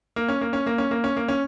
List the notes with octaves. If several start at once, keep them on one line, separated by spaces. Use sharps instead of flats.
A#3
C#4
A#3
C#4
A#3
C#4
A#3
C#4
A#3
C#4